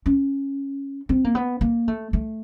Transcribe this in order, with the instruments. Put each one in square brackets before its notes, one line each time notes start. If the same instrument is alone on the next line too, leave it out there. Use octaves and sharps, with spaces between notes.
[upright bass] C#4
C4
A#3
B3
A#3
A3
A3